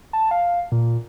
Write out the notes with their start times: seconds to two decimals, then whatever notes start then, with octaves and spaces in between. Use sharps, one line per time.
0.13 A5
0.31 F5
0.72 A#2